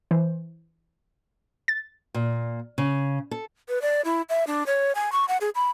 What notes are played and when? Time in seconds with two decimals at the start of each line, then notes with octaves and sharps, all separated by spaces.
0.11 E3 C5
1.68 A6
2.14 A#2
2.78 C#3
3.31 A4
3.69 B4
3.82 D5
4.05 E4
4.29 E5
4.47 D4
4.67 C#5
4.95 G#5
5.12 C#6
5.28 F#5
5.41 G#4
5.55 B5